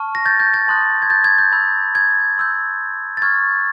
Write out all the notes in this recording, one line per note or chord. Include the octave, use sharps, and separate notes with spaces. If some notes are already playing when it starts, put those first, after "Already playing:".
Already playing: A5 C#6 F6
A#6
G6 A6
G6 A6
G6 A6
A5 C6 D#6 F#6
G#6
G6 A6
G#6
G6
B5 E6 G6
G#6
C6 E6 G6
A6
C#6 F6 G#6